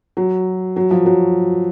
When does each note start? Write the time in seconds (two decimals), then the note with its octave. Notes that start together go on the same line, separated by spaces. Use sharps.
0.17 F#3
0.76 F#3
0.91 F3
1.06 F#3